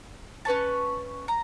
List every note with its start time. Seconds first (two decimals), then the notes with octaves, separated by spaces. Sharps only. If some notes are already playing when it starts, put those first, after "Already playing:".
0.45 C#4 B4 C#5 A5
1.28 A#5